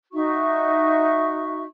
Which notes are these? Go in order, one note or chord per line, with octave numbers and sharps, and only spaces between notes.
D#4 F#4 E5 C#6